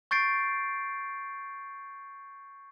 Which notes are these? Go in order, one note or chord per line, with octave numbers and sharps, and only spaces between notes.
C#6 G6 A6 C7 D7